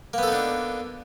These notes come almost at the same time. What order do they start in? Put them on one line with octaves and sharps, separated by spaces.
A#3 B3 A4 D#4 D4